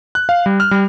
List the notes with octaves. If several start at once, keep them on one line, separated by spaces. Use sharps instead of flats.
F#6
F5
G3
F6
G3